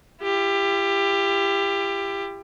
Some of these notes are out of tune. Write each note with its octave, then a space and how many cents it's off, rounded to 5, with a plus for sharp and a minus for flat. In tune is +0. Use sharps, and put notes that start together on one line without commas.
E4 +45 G4 +20